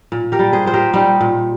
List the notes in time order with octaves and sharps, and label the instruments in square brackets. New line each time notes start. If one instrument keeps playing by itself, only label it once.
[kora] A#2
G4 A#4
G3
G#4 C5
A#2 C5
G4 A#4
G3 D#4 G4
A#2